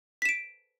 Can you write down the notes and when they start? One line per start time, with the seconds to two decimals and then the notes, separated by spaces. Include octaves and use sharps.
0.22 B6
0.25 E7
0.29 D7